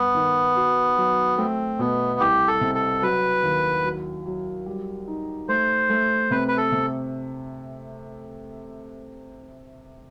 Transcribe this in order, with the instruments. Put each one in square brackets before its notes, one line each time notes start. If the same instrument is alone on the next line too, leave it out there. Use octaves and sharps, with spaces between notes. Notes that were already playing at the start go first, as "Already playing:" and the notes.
Already playing: [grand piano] G2 [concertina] B3
[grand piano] D#3
F#4
F#3
[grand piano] A3 [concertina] C4
[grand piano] B2 [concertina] B3
[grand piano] C2 [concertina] G4
[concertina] A4
[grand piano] C3
[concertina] A4
[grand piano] F#3 [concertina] B4
[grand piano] D#2
F#3
F#3
G3
D#4
[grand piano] A3 [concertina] C5
[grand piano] A3
[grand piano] C3 [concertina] B4
[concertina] B4
A4
[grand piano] C3